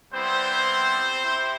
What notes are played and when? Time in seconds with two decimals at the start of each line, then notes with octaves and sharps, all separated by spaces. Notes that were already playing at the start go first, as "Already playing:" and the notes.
0.13 G3 B3 C4 E4 C5
1.24 C4 E4 G4